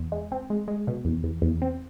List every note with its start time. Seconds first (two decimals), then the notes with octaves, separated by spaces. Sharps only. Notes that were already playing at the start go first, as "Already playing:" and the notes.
Already playing: E2
0.12 G#3
0.32 C4
0.50 G#3
0.68 G#3
0.87 B2
1.05 E2
1.23 E2
1.42 E2
1.62 C4